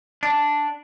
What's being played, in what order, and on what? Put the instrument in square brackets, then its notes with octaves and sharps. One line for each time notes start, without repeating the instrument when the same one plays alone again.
[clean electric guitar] D4